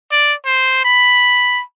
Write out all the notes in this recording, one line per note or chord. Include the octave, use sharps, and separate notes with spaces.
D5
C5
B5